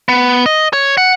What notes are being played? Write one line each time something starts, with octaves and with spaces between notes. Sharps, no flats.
B3
D#5
C#5
F#5